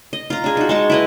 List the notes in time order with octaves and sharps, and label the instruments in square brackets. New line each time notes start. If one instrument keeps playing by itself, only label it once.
[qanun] D#5
F4 A#5
D4 G#4
D#4 F#4
G#3 A5 C#6
E4 B4 D#5